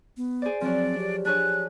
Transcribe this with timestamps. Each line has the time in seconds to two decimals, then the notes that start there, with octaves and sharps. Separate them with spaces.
0.17 B3
0.42 G#4 C5 D5
0.61 F3 F#3 C4 D5
0.98 G4
1.25 D4 G#4 C#5 F#6